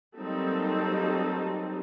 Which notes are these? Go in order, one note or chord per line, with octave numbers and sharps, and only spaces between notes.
F#3 G3 A#3 C4 D#4 A4